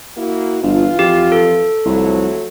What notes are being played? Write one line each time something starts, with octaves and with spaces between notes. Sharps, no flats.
A#3 E4 F#4
G1 E3 F4
F2 G4
A4
C2 F3 F#3 A3